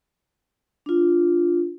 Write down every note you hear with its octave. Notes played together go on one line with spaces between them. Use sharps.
D4 F4